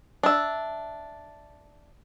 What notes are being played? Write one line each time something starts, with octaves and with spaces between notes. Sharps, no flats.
D4 E5